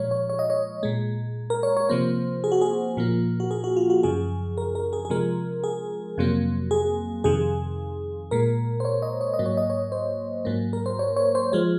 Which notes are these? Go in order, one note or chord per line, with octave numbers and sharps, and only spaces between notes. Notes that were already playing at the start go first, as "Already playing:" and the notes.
Already playing: A#2 F3 G#3 C#5
C#5
C#5
D#5
C#5
A#2 G#3
A#4
C#5
C#5
C3 F3 A#3 C5
G#4
F#4
G#4
A#2 F3 A#3
F#4
G#4
F#4
F4
F#4
F#2 C#3 F3 G#4
A#4
A#4
G#4
G#4
C3 F3 G#3 A#4
G#4
F2 C3 F#3 A#3
G#4
F2 C3 D#3 G#4
A#2 G#3 A#4
C5
C#5
D#5
C#5
D#5
G#2 F#3 A#3
C#5
D#5
C#5
C5
G#2 F#3 A#3
A#4
C5
C#5
C#5
C5
F3 G#3 C5